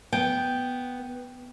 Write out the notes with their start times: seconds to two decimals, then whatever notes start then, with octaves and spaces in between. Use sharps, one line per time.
0.13 B3 G5